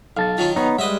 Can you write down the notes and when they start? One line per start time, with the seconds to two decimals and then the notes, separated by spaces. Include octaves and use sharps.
0.17 B1 F5 A5 A6
0.38 D#3 F#3 C#4 F4
0.56 B3 D#4 C#5 F#5
0.79 G3 G#3 B4 D#5 E5